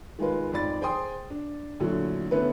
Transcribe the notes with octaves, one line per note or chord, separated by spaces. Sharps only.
D#3 G#3 F4 B4
F2 G#2 D5 B5 A6
G#4 C5 G5 G#5 C6 D#6
D4
A#1 A2 D3 F#3
D3 A3 B3 C#4 E4 B4